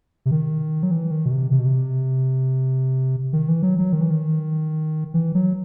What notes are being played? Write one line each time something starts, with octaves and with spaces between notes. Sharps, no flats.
C3
D#3
F#3
E3
D#3
B2
C3
C3
B2
C3
D#3
E3
F#3
F#3
D#3
E3
D#3
E3
F#3